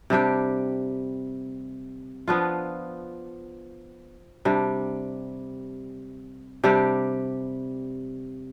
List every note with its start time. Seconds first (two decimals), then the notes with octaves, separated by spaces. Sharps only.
0.10 C3 G3 D4 G4
2.28 F3 B3 D4 F4
4.45 C3 G3 D4
6.64 C3 G3 D4 G4